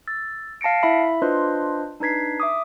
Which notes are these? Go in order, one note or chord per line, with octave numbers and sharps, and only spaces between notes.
E6 A6
F5 A5 A#6 C#7 D7
E4 E5 B5
D4 F4 B4 C5 D#5 C6
D4 D#4 B4 G#6 B6 C7
E5 D6 D#6